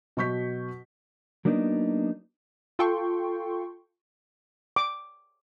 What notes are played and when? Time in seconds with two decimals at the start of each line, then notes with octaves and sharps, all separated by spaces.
0.17 B2 F#3 C#6 G6 B6
1.45 F#3 A#3 B3 D4 D#4
2.79 F4 A4 G5 C6 C#6
4.76 D6